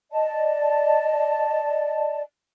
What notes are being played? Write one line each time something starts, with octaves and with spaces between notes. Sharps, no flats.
D5 D#5 A5